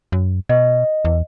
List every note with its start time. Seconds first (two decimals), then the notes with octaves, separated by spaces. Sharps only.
0.12 F#2
0.49 B2 D#5
1.05 E2